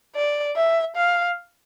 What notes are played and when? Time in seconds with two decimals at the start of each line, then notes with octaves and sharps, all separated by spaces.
0.16 D5
0.56 E5
0.96 F5